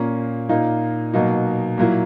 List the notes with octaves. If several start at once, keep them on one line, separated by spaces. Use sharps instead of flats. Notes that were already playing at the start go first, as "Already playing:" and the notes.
Already playing: A#2 A#3 C#4
A#2 A#3 D#4
B2 F#3 A#3 D#4
A#2 F#3 A#3 E4